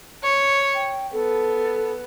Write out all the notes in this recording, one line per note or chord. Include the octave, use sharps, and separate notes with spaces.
C#5
G5
B3 A4